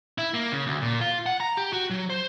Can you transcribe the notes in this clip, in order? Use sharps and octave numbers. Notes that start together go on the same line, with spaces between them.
E4
A#3
C#3
D2
A#2
F4
F#5
A#5
G4
F#4
F#3
C5